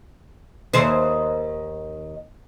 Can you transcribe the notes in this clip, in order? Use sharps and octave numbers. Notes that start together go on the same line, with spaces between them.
D#2 D#3 C5